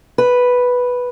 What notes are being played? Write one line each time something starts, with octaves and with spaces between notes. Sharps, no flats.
B4